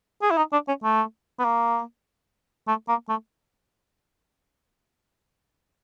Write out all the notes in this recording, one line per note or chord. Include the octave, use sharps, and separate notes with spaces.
G#4
E4
D#4
D4
C#4
A3
B3
A#3
A3
A#3
A3